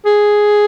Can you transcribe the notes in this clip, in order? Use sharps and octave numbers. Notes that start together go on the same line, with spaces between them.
G#4